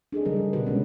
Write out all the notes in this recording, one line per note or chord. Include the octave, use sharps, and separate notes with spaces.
D4 G#4 A4 D#5
C#3 G3 D4 D#4 A#4
G3
B2 D3 F#4 B4
C3 G#3 C#4